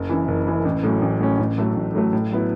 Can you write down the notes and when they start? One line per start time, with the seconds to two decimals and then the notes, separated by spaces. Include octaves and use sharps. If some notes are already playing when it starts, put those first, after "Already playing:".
Already playing: F#1
0.10 F#2 E3
0.28 F#1
0.47 F#2 E3
0.65 A1
0.83 A2 F#3 C#4
1.02 A1
1.20 A2 F#3 C#4
1.39 A1
1.58 A2 F#3 A3
1.76 A1
1.95 A2 F#3 A3
2.13 A2
2.31 F#3 B3 E4